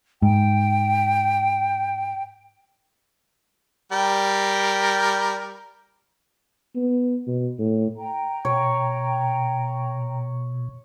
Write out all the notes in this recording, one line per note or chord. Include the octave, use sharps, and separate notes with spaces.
G#2 G5
G3 A#4 G5
B3
B2
A2
G5 A#5
B2 C#5